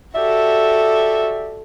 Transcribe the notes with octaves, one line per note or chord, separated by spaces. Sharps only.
F#4 G4 A4 D5 E5